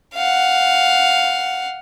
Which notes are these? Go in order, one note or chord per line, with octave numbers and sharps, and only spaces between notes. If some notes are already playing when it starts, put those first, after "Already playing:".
F5 F#5